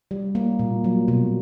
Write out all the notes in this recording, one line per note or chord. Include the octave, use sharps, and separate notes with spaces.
G3
A#3
A#2
F#3
B2